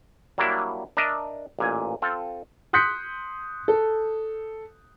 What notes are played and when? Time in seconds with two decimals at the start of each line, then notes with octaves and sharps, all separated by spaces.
0.38 F#3 G3 A#3 D4 E4
0.97 D4 A#4 D#5 E5
1.59 A1 A#2 G#5
2.02 C4 F4 A4
2.73 C6 D#6 F#6 G6 B6 C#7
3.68 A4